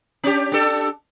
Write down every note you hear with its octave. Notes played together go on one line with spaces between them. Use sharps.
C#4 D4 G4
D4 G4 A4